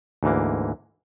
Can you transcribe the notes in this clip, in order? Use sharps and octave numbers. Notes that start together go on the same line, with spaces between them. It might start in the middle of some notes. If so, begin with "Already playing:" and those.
D2 G#2 E3 A#3